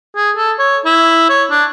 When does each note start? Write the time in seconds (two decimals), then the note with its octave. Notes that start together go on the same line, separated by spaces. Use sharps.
0.16 G#4
0.37 A4
0.59 C#5
0.85 E4
1.29 C#5
1.50 D4